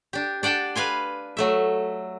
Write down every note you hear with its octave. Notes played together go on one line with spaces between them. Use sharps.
D4 G4
D4 D5 F#5 G5 A5
B4 F5 G#5 C6
F#3 A3 E5